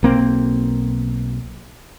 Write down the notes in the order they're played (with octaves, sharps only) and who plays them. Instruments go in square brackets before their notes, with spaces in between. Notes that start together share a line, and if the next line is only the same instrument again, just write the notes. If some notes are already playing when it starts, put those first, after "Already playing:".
[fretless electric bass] B1 A#3 C4